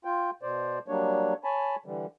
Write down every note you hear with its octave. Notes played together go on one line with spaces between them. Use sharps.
F4 G5
B2 C5 D5
F#3 G3 A#3 D4 C#5
C#5 G#5 A5 B5
D3 E3 G3